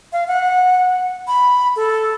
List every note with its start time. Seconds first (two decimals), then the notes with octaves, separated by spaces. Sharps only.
0.13 F5
0.28 F#5
1.27 B5
1.76 A4